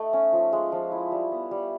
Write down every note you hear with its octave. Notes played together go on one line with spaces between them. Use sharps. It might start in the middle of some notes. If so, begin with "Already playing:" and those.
Already playing: A3 D#4
C#4
F3
G#3
F3
E4
G3
B3
G3